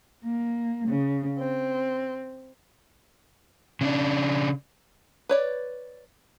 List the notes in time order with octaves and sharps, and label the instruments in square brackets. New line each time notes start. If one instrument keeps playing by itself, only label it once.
[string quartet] A#3
C#3
C4
[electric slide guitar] C#3 C#4 D4
[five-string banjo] B4 C#5 D5